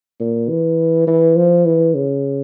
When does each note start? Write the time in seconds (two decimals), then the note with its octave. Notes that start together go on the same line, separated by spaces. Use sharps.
0.20 A#2
0.49 E3
1.07 E3
1.36 F3
1.66 E3
1.95 C#3